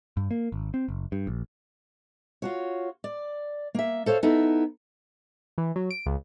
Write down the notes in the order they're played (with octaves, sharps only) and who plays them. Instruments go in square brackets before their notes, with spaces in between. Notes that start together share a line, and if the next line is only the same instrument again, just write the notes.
[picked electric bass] G2
A#3
G#1
C4
F#1
G2
A#1
[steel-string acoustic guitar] F4 F#4 C#5
D5
A#3 E5
A4 C5 C#5 F5
B3 D#4 E4 A4
[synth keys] E3
F#3
D7
C#2